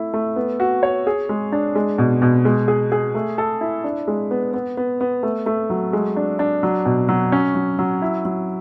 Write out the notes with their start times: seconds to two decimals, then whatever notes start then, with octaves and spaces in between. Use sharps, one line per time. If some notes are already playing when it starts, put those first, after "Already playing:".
Already playing: A3 E4
0.14 A3
0.36 B3
0.60 F#4
0.83 C#5
1.07 G#4
1.29 G#3
1.52 D4
1.76 G#3
1.98 B2
2.22 B2
2.45 G#3
2.68 G#4
2.92 G#4
3.15 A3
3.38 A4
3.61 E4
3.84 D4
4.08 G#3
4.31 B3
4.54 B3
4.77 B3
5.01 B3
5.23 A3
5.46 A3
5.70 F#3
5.93 G#3
6.17 D4
6.39 D4
6.63 F#3
6.86 B2
7.09 F#3
7.32 C#4
7.55 F#3
7.79 F#3
8.02 E4
8.25 F#3